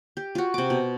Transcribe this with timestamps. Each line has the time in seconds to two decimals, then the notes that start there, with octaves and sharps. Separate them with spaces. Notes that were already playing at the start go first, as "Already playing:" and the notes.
0.17 G4
0.35 F4 F#4
0.54 C3 D6
0.70 B2